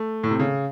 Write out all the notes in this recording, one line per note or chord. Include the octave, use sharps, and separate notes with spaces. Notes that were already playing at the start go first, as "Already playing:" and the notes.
Already playing: A3
A2
C3
C#3